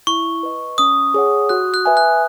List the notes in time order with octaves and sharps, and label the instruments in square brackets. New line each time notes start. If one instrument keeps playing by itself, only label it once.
[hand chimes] E4 [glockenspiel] C#6
[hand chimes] B4 D#5
[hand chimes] C#4 [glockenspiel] D#6
[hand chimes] G#4 C#5 F#5
[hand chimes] F#4 [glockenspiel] F#6
[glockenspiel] F#6
[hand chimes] B4 E5 G#5
[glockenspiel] F#6